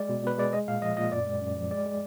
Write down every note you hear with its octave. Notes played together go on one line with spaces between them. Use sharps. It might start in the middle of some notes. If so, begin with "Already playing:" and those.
Already playing: G#3 D5
B2
B2 B4
G#3 D5
G#3 D#5
A#2 F5
F3 D#5
A#2 D#5
F#2 D5
G#3
F#2
F3
G#3 D5
G#3